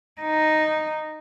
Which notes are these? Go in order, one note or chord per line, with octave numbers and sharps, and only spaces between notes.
D#4